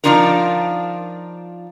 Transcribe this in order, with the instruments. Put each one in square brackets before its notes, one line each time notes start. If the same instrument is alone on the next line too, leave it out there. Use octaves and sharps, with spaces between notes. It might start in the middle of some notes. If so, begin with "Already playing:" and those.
[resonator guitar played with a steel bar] F3 A3 D4 D#4 F4 A#4